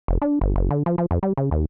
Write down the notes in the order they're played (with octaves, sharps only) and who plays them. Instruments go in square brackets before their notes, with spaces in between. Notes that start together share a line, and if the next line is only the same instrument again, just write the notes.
[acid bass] F1
D4
G1
F#1
D3
F3
F3
F2
G3
C#3
D#2